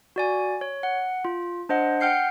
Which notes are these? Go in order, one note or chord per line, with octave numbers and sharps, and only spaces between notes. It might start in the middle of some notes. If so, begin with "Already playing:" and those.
F#4 D5 G#5
C#5
F#5
F4
D4 C5 D#5 F#5
F#5 G5 F6 G6 C7 C#7